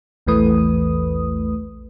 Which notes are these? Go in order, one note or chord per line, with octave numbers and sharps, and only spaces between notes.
A#1 E2 E3 A3 B4 D#6